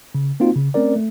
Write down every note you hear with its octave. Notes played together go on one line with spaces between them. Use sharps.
C#3
A#3 C4 D#4 F4 F#4
C#3
A3 C4 C#4 A#4 D5
A3